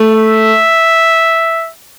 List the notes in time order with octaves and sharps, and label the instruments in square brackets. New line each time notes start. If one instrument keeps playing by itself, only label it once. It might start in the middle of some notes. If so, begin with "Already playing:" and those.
Already playing: [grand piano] A3
[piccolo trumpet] E5